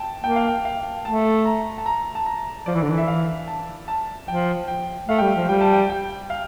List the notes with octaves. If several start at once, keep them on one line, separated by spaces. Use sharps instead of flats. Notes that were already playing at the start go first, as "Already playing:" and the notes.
Already playing: G5 A5
A#3 G5
F5
G5
F5
A3 A5
A#5
A5
A#5
A5
A#5
F3 D5
E3
D3
E3
E5
F5
A5
A5
F3 G5
G5
A3 F5
G3 G5
F5
F3
G3 G5
A5
G5
G5
F5